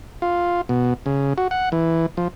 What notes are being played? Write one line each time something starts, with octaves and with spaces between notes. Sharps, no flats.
F4
B2
C#3
F#4
F#5
E3
F3